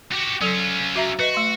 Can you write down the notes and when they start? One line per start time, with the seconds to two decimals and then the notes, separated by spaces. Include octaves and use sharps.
0.12 F#4 G4
0.42 F#3 C#4 F4 A4
0.96 F#4 E5 A#5
1.19 F#4 B4 D#5
1.34 A3 C6